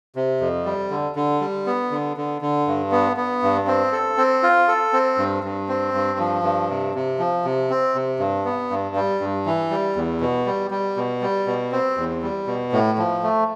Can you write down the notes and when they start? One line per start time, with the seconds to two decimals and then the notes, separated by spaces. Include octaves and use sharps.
0.16 C3
0.41 F2
0.65 G3
0.90 D3
1.15 D3
1.41 G3
1.66 B3
1.91 D3
2.17 D3
2.42 D3
2.67 G2
2.92 B3
3.17 B3
3.42 G2
3.67 C4
3.92 A4
4.17 C4
4.43 F4
4.68 A4
4.93 C4
5.18 G2
5.44 G2
5.69 C4
5.94 G2
6.19 F3
6.43 G2
6.69 C3
6.95 C3
7.19 F3
7.45 C3
7.70 C4
7.95 C3
8.19 G2
8.45 B3
8.70 G2
8.95 G3
9.20 G2
9.46 E3
9.70 G3
9.96 E2
10.21 B2
10.46 G3
10.71 G3
10.97 B2
11.22 G3
11.47 B2
11.72 C4
11.97 E2
12.22 G3
12.47 B2
12.72 A2
12.98 F3
13.23 A3